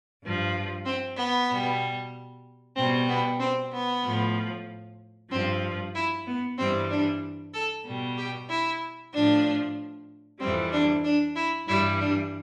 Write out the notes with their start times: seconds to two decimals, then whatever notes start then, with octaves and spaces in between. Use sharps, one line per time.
0.22 G2 F3
0.85 C4
1.17 B3
1.49 B2 G3
2.76 B2 C4
2.81 G3
3.08 B3
3.39 C4
3.72 B3
4.03 A2 F3
5.30 G2 F3 C4
5.94 E4
6.26 B3
6.57 G2 E3 G3 C4
6.90 D4
7.53 A4
7.85 B2 G3
8.17 G4
8.49 E4
9.13 A2 F3 D4
10.39 F2 E3 G3 C4
10.72 D4
11.04 D4
11.35 E4
11.67 G2 E3 G3 E4
12.00 D4